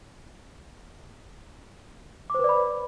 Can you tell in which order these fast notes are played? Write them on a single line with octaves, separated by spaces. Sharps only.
D6 C5 B4 D5 B5